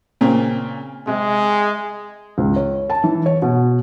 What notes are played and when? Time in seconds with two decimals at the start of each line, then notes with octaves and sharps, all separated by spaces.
0.21 A#2 C#3 C4
1.07 C3 G#3
2.38 C#2
2.56 C#5
2.90 A5
3.04 E3
3.26 C#5
3.42 B2